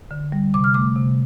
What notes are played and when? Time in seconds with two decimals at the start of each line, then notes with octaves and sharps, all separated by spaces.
0.11 D3
0.32 G3
0.54 C3 D6
0.64 F6
0.74 A3 D6
0.96 C3